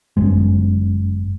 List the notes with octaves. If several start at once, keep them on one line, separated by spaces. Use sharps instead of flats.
G1 F#2 G#3